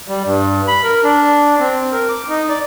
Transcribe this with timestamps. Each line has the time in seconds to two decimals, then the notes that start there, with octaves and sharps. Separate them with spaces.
0.08 G3
0.25 G2
0.68 B5
0.84 A#4
1.04 D4
1.60 C4
1.92 A#4
2.09 D6
2.29 D#4
2.49 D5